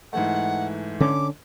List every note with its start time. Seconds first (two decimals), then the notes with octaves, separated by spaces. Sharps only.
0.13 G#2 E3 A3 F#5
1.00 D3 C#4 D6